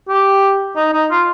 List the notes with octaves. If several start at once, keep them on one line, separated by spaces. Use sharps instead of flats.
G4
D#4
D#4
F4